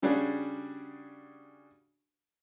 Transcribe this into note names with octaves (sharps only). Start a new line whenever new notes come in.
C#3 G3 C#4 D4 F#4 G#4